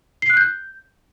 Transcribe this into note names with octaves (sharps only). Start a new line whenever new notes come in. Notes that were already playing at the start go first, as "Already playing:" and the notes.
C7
F#6
G6